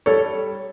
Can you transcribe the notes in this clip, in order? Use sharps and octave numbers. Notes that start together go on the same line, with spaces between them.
G3 A4 C#5